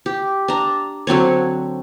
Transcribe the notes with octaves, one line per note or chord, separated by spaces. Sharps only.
G4
D4 A#5
D3 F#3 C4 C#5